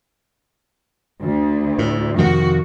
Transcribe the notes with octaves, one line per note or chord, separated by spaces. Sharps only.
D2
A2
F2 C3 D#3 F#4